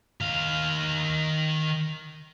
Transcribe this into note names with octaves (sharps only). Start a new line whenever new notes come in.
D#3 F5